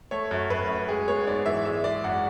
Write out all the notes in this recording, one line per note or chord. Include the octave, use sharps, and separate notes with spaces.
A3 C#5
F#2
F#2 B4
F#2
G#3 G#4
B3 C#5
G#2 D5
E3 E5
G#3 E5
G#3 D5
F#2 F#5